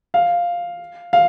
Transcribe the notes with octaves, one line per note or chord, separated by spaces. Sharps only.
F5
F5